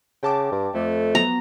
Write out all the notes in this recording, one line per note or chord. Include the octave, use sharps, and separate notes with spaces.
C#3 G5 A5 D6
G2
F2 A3
F3 F#3 B3 A#5